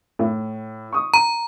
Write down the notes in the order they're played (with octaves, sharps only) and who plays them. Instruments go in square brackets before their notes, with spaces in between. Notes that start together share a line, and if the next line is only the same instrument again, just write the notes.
[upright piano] A2
C#6 D#6
[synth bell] A#5 [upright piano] D#7